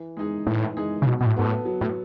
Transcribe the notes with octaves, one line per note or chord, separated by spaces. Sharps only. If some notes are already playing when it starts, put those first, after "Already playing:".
Already playing: E3
G#3 D#4 G#4
A2 E3
G#3 D#4 G#4
C#3
B2 F#3
B2
A2
G#2 B3 F#4 A4
A2
F#3
A2